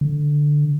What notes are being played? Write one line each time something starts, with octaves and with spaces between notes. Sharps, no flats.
D3